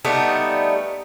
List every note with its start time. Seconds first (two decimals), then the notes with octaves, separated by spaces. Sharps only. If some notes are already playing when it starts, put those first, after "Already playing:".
0.05 G3 A3 B3 D#4